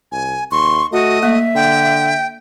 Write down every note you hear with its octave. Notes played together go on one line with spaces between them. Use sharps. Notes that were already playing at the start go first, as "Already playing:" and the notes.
C2 G#5
D#2 C6 C#6
A3 F#4 D#5
A#3 E5
D3 G5